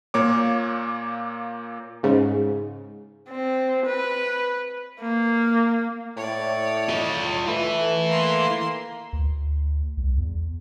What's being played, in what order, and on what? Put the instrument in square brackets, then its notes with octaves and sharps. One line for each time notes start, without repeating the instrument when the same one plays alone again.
[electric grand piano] A#2 A#3 C#5 D6
[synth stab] G#2 C#3
[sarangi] C4
B4
A#3
[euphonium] A2 [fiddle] C#5 D5
[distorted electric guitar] F4 D#5
[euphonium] A3 [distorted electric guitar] E4 B4
[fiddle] A#3 C6
[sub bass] D2
C2
E2